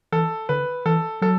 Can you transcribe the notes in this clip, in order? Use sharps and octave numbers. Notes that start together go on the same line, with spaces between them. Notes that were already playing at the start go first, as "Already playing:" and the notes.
E3 A4
D3 B4
E3 A4
F#3 A4